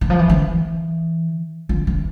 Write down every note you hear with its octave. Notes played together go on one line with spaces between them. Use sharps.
E3
F3
E3
E3
F3
E3